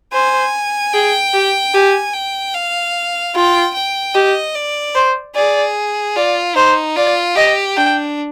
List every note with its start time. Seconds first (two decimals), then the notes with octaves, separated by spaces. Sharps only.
0.13 C5 G#5
0.94 G#4 G5
1.34 G4
1.74 G4 G#5
2.14 G5
2.54 F5
3.35 F4 G5
3.74 G5
4.14 G4 D#5
4.55 D5
4.95 C5
5.35 G#4 D5
6.16 F4 D5
6.56 D#4 C5
6.96 F4 D5
7.36 G4 D#5
7.77 D4 G5